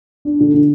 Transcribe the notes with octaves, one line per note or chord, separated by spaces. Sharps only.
D4
D3
D3